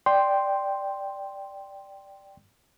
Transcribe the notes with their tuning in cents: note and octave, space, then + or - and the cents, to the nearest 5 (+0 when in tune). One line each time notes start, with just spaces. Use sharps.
D5 +0 G5 +0 C6 +0